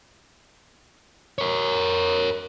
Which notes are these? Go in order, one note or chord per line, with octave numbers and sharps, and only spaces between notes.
A#4 C#5